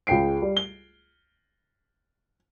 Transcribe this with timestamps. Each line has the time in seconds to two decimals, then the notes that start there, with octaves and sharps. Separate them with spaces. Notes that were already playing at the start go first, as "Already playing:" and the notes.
0.07 C#2 G#4 G5 C7 D7
0.42 G3
0.57 G7